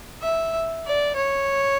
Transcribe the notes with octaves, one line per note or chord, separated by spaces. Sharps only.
E5
D5
C#5